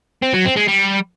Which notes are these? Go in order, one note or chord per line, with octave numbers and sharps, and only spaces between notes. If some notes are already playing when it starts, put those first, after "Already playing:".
C4
F#3
C4
G#3
G3